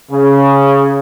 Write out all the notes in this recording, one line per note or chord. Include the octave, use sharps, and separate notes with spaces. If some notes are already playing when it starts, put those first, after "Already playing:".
C#3